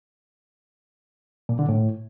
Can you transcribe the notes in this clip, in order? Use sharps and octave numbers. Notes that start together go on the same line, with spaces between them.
A#2
D3
A2